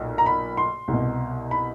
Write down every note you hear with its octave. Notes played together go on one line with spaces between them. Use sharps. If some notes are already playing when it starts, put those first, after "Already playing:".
Already playing: B1 A#2
A#5
B5
C6
C2 B2
B5